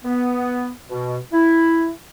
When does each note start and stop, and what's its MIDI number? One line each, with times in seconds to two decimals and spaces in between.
0.04 0.70 59
0.89 1.18 47
1.33 1.91 64